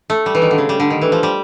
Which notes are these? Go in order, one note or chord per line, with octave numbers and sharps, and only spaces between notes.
A3
G3
E3
D#3
D3
C#3
G3
D3
D#3
E3
F3
G3